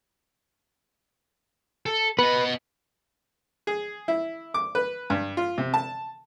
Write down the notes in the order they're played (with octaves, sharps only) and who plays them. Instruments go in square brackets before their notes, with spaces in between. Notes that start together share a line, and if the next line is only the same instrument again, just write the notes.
[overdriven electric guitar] A4
[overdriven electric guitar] B3 D#5 [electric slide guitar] B4
[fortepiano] G#4
E4
D6
B4
G2
F4
C3
A5